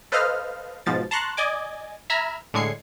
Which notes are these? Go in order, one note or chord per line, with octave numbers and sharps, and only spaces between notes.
A4 B4 C5 D#5 F5 F6
G#2 B2 F3 A6
A5 A#5 C6 C#6 F#6 A6
D5 D#5 G#5 D6
E5 A#5 B5 E6 F6 G#6
A2 D3 G#3 G#6 C7 C#7